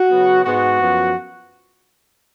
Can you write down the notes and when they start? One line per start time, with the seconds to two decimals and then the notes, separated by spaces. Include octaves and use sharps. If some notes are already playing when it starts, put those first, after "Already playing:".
Already playing: F#4
0.10 C#3 F#3 B3
0.44 G#2 G#3 B3 F#4
0.78 F#2 F3 B3